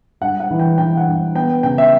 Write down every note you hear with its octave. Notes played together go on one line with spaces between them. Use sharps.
G2 F#5
F#5
E3
G5
E3 G5
F#5
G2
B3 G5
C#3 G5
E5